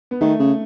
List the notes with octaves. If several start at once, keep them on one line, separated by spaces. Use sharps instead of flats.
B3
D#3 A3
C#3